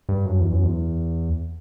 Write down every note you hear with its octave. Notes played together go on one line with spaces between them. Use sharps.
G2
F#2
E2
F#2
E2